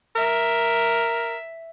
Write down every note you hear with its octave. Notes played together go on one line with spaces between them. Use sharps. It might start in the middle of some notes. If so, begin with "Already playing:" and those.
A#4 E5